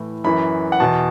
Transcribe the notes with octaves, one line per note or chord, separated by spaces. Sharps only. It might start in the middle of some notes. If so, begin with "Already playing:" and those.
Already playing: A2 E3
F#2 E3 B5
F#5
E2 B2 A5